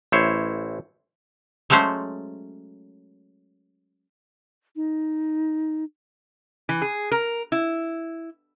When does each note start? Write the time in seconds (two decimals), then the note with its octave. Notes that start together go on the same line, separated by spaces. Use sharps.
0.12 A1 E4 C5 C#5
1.70 F#3 G#3 A3 C#4 C5
4.76 D#4
6.69 E3
6.82 G#4
7.11 A#4
7.52 E4